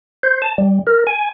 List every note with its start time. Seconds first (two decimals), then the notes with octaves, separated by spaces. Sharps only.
0.23 C5
0.42 A5
0.58 G3
0.87 A#4
1.07 G#5